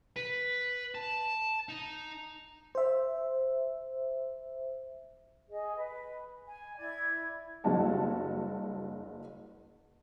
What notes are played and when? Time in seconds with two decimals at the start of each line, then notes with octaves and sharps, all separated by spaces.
0.16 B4
0.94 A5
1.69 D#4
2.75 C5 E5
5.50 G#4 D#5
5.76 B4
6.46 G#5
6.78 E4 D5 G#6
7.64 F#1 G2 F#4 A5